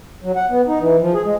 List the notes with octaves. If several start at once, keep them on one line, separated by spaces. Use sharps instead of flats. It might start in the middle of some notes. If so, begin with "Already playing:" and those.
F#3
F#5
B3
D#4
E3
F3
G#4
G#3